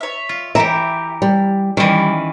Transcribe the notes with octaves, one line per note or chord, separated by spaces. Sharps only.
C#5 E5
F4
E3 G4 E5 A#5
G3
D#3 E3 G3 C#4 D5